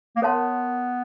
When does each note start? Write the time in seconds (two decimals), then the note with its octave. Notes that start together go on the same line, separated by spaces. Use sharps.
0.16 A#3
0.22 B3 A#4 C#5 F#5 A5 C6